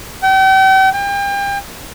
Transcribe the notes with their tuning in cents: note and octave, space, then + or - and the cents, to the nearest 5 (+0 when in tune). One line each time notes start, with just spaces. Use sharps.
G5 -40
G5 +35